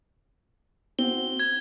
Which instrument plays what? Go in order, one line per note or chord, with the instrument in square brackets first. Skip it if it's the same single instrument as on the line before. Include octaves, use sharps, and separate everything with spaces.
[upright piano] C4 F#4 [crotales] G7
[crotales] G#6